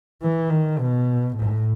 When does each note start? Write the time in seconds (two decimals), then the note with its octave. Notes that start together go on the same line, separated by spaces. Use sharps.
0.23 E3
0.51 D#3
0.79 B2
1.37 A2